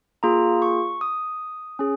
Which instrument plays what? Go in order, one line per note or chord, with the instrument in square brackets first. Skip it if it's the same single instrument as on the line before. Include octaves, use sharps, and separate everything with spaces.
[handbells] A#3 F4 G#4 A#5
C#6
D#6
C#4 G#4